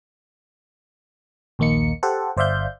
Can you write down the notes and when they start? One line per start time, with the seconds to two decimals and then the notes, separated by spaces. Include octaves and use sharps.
1.59 A#1 D#2 A#3 D#4 C#7
2.03 G4 A4 C5 F#5
2.37 G1 C5 D5 E5 F5 G6